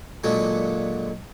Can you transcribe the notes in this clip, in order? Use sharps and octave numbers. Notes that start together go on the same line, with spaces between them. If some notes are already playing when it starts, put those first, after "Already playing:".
A#2 D3 F#3 G#3